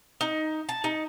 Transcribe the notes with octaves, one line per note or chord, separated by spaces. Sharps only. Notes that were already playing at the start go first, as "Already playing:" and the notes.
D#4
A5
D#4